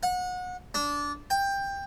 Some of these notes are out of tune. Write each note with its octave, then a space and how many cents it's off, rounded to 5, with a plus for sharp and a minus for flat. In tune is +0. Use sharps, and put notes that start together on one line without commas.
F#5 -30
D4 -20
G5 +15